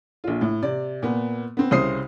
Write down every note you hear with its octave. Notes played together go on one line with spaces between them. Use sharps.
A#1 F4
A2
C3 D5
A#2 B3
B3 C4
C2 C#3 C5 D#6 C7